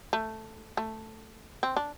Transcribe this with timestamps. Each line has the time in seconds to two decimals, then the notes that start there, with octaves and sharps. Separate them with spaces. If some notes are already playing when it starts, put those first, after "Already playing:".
0.13 A3
0.77 A3
1.63 C4
1.77 D4